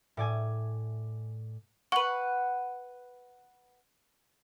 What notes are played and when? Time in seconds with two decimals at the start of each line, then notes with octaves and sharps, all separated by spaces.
0.17 A2 D5 G#5
1.92 B4 F#5 C#6 F#7